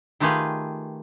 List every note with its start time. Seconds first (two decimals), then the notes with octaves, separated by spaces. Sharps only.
0.20 D#3 A3 F4 G4 G#4 B4